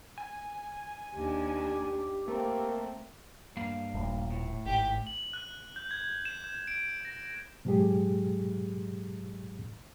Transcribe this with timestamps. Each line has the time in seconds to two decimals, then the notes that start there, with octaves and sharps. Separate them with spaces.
0.18 G#5
1.13 D#2 D4 G4
2.28 A3 A#3 C4
3.57 G2 A#3 F5
3.94 D#1 A3
4.30 A2
4.66 G#1 G4
5.07 F#7
5.33 F#6
5.76 G6
5.91 G#6
6.25 E7
6.44 G6
6.67 D7
7.05 A#6
7.65 G#2 B2 F#3 G#3 G4 G#4